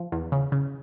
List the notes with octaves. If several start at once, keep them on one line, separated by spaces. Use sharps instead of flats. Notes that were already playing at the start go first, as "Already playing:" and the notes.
Already playing: F3
E2
C#3
C#3